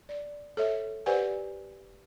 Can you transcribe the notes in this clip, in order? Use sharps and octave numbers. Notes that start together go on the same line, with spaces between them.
D5
A4 C#5 E5
G4 B4 C5 D5 F#5 G#5